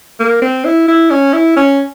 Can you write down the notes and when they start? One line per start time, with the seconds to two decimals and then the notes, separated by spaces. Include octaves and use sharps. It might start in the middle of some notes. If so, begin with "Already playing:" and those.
0.20 A#3
0.42 C4
0.65 E4
0.88 E4
1.11 C#4
1.33 E4
1.57 C#4